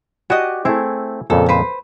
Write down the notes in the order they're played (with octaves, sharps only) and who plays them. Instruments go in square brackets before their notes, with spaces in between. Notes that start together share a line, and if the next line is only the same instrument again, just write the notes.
[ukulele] F#4 D#5 [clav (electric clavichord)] G4 D5 G#5
[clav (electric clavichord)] A3 C4 [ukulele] E4 G#4
[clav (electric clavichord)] F2 A#2 C#3 [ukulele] A4
[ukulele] B4 C5